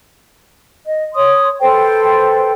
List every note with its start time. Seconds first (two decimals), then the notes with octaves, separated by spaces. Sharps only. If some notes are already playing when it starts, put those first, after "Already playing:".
0.86 D#5
1.14 C#5 C6 D#6
1.61 A4 B4 C5 G5